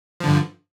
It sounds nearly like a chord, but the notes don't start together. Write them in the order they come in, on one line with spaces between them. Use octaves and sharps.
F3 D3 G2